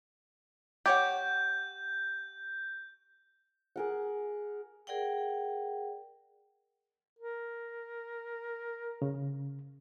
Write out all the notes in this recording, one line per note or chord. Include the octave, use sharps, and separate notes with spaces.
G4 C#5 F#5 G6
G#4 A#4 F#5
G#4 A#4 D5 F#5 G5
A#4
C#3